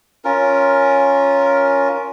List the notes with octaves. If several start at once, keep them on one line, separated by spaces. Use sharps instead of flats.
C#4 F4 A#4